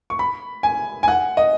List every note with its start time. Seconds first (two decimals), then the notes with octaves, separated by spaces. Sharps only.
0.10 C#6
0.19 B5
0.63 G#5
1.03 G#5
1.08 F#5
1.37 D#5